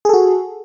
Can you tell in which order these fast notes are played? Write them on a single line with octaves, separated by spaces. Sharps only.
G#4 A4 F#4